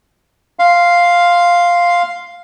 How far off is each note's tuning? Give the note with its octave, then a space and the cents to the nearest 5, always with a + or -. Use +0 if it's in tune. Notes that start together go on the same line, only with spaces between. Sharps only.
F5 +0 C6 +0